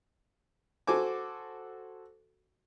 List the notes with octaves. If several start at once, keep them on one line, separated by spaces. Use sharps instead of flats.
F#4 A4 C5 G#5 D6